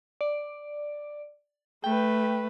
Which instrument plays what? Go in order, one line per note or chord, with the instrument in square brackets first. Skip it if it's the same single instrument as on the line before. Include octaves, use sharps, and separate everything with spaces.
[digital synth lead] D5
[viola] A3 B4 [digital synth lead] G5